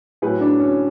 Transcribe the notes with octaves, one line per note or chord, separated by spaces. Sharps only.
A2 F#3 G#4 B4
D4
C#4